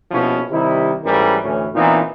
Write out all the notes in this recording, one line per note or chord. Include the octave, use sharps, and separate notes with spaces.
A#1 B2 F3 C#4 E4
C3 D#3 G3 D#4 E4
A1 G#2 E3 G3 C#4 A#4
D2 A2 E3 C#4
A#2 E3 B3 C4 D#4